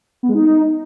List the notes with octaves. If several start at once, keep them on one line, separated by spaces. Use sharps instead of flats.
B3
G#3
D#4